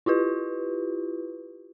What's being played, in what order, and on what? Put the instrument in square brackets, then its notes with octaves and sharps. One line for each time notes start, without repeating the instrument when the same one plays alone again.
[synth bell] E4 F4 G4 B4